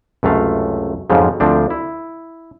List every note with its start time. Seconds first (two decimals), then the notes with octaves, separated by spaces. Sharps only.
0.23 C#2 F#2 C3 A3 F5
1.10 F2 G#2 C#3 F3 F#3
1.40 D2 F3 C4 D4
1.70 E4